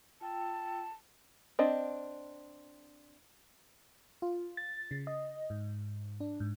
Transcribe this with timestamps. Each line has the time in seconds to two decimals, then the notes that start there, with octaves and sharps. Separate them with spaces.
0.21 F4 G5 A5 E6
1.59 C4 D4 D#5
4.22 F4
4.57 A6
4.91 C#3
5.07 D#5
5.50 G#2
6.20 D4
6.40 G#2